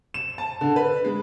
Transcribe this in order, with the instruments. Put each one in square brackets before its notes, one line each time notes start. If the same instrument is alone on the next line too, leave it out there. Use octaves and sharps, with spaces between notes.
[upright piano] E7
A5
D3
B4
G#3